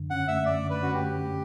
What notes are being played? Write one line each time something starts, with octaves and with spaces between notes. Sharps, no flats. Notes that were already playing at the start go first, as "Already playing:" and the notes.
Already playing: F#2 D3
C#4 F#5
A3 E5
F#2 D5
D3
B4
C#4 F#4
G4
A3
F#2